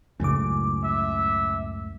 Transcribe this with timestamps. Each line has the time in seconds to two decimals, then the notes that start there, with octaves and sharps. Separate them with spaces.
0.20 C#2 F#2 A2 C#3 D6
0.84 E5